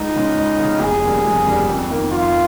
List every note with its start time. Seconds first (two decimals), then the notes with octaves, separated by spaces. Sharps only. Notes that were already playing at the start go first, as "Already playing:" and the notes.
Already playing: C#2 D#4
0.16 C#3 G#3 C#4
0.37 C#2
0.59 C#3 G#3 C#4
0.80 F1 G#4
1.03 D#2 C#3 G3
1.25 F1
1.46 D#2 C#3 G3
1.69 F2
1.90 D#3 A#3
2.12 F2 F4